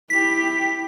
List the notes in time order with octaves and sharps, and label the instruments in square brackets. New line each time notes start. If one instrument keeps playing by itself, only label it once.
[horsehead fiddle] E4 G4 [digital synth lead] B6